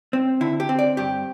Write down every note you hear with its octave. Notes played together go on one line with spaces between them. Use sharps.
C4
D3 E4
G4
C4
D5
G2 G4